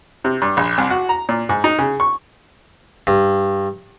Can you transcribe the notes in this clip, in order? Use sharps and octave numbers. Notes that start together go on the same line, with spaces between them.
C3
G2
A#1
C2
F#4
A#5
A#2
G#2
D#4
C#3
C#6
G2